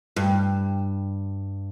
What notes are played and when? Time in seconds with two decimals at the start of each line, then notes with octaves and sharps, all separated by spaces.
0.16 G2